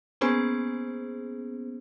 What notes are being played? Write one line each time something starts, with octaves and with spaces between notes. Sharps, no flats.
A#3 B3 C#4 G#4 C5